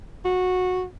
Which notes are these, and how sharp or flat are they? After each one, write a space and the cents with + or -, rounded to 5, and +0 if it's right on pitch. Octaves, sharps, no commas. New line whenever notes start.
F#4 -15